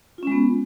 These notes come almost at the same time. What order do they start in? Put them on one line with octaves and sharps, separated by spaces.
F4 C#4 G#3 B3